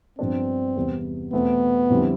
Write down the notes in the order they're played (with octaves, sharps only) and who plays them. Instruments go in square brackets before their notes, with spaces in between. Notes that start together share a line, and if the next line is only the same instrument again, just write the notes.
[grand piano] G2 F3 B3 D4 [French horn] C4
[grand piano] E2 C3 G3 B3
[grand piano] E2 B2 A3 C4 [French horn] B3
[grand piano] F2 D3 G3 C4 E4